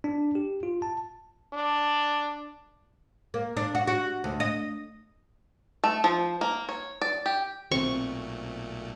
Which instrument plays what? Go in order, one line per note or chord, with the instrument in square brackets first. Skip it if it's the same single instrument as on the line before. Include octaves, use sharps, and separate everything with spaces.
[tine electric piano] D4
G4
F4
A5
[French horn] D4
[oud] A#3
D4
F#4
F#4
D2
D#5
[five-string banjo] A3
F3
A#3
C#5
D5
G4
[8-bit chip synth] B1 A#2 A3 [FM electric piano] C4 [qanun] C#6